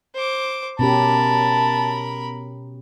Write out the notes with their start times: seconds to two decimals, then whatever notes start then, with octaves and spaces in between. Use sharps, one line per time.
0.15 C5 D6
0.79 B2 C#4 G4 A#4 A5 B5